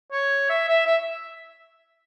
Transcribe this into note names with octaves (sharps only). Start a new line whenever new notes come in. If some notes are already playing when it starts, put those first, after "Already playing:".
C#5
E5
E5
E5